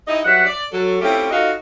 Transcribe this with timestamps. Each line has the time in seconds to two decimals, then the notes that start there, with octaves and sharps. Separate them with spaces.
0.07 D#4 E4 G4 D#5
0.24 G2 F#3 D4 E5 F#5
0.46 D5
0.72 F#3 A4
1.01 A3 C4 C#4 E4 F4 G4
1.31 D#4 F4 F#4 A4 D#5 F5